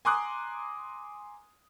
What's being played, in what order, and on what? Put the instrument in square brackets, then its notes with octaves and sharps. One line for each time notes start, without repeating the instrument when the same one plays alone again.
[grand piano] G#5 A#5 C6 D6 D#6 F#6